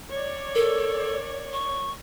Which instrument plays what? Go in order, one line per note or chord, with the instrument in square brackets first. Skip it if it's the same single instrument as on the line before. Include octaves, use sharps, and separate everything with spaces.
[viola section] C#5 D5
[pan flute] A4 [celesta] A#4
[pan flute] C#6